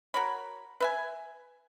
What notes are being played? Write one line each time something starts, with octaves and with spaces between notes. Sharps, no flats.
F#4 A#4 C#5 B5
B4 E5 G#5